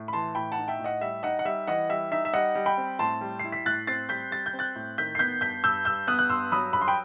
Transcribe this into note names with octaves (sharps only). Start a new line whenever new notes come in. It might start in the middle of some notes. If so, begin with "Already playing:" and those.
Already playing: A2
B5
E3 A5 C6
A2 G5 B5
F#5 A5
D#4
E5 G5
A2
D#5 F#5
G3 E5
D#4 D#5 F#5
F#5
G3 E5
E3 D#5 F#5
G3 E5
D#4 E5
E5
G3 D#5 F#5
G3
G5 B5
C4
A2 A5 C6
G3
E4 C7
B6
A2 F#6 A6
C4 A6 C7
G3 G6 B6
G3 A6
G6
C4
F#6 A6
A2
D#3 G6 B6
C7
B3 G6 B6
G2 G6 B6
G2 E6 G6
G2 E6 G6
B3 D#6 F#6
F#6
G2 C6 E6
F#3 B5 D#6
G2 B5
C6
G5 B5